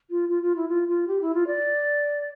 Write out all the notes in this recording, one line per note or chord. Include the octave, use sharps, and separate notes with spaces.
F4
F4
F4
E4
F4
F4
G4
E4
F4
D5